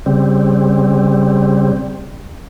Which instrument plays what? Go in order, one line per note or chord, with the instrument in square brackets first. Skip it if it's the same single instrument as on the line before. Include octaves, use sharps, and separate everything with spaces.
[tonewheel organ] C#3 G3 C4